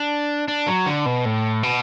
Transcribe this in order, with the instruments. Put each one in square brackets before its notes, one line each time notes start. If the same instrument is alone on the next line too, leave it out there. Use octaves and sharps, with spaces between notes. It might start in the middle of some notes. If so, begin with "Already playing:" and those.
Already playing: [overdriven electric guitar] D4
D4
F#3
D3
B2
A2
B2